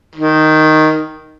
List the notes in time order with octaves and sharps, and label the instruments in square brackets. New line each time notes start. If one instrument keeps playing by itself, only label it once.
[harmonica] D#3